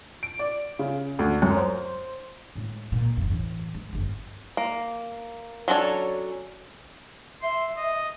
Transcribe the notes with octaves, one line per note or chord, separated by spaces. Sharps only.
D7
D5
C#3
D2
F#2
C5
A2 G#3
A#2
F#1 E2
A1 E3
G#3
G1 F2
A#3
F#3 C#4 D4 A4
E5 C6
D#5